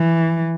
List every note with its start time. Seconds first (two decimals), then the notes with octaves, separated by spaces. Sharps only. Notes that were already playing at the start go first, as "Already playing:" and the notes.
Already playing: E3